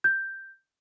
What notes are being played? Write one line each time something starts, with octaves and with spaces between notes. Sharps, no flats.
G6